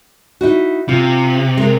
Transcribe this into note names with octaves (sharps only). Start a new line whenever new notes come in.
D#4 E4 F#4
C3 F4
G#3 A#4